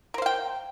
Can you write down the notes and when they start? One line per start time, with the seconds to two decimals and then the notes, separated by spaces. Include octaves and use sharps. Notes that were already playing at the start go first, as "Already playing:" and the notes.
0.14 A#4
0.18 C5
0.22 F5
0.26 G5